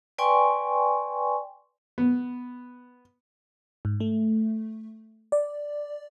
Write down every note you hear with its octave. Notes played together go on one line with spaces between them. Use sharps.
B4 D5 G5 G#5 C6 C#6
B3
G#2
A3
D5